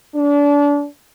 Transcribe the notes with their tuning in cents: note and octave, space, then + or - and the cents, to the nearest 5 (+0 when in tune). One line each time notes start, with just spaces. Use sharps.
D4 -30